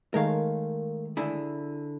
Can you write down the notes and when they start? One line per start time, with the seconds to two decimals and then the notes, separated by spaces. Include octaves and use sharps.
0.14 D#3 G#3 A3 A#4 C#5 F5
1.17 D3 E4 G#4